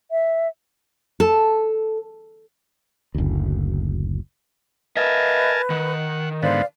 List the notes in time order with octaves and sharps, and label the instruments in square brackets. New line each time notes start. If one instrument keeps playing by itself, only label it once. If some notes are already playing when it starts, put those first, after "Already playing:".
[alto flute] E5
[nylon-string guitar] A4
[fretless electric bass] F#1 D2
[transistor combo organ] A#4 G#5 A5 [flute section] B4 [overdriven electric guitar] D#5 E5
[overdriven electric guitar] D#3 [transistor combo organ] F#5
[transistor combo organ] G#2 D3 B3 [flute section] C5 D5 F5